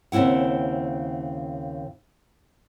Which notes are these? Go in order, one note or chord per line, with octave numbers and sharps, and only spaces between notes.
D#2 C#3 C4 E4 F#5